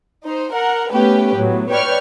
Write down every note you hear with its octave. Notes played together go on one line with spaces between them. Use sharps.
D#4 C5
A#4 F#5
A3 B3 C#4 G4 B4
A2 F#3 B3
B4 C#5 D5 G5 C#6 F6